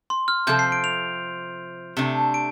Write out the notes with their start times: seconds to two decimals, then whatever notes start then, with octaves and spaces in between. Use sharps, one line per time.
0.10 C6
0.28 F6
0.47 C3 F3 C4 A4 G6
0.59 C7
0.72 D7
0.84 F7
1.97 C3 A3 D4
2.34 D7